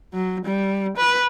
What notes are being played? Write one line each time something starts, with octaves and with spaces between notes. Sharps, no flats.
F#3
G3
B4